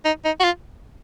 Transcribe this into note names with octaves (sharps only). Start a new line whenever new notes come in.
D#4
D#4
F#4
F4